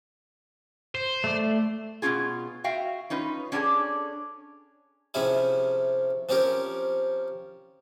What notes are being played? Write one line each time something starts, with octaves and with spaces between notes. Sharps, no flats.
C5
A3 D5
B2 F3 C#4 F4 G#4
F#4 E5 F5 G5
C#4 D#4 F4 B4
C#4 D4 F4 F#4 G#4 A4
C3 F3 C#4 E4 G#4
F3 C4 C#4 G4 A#4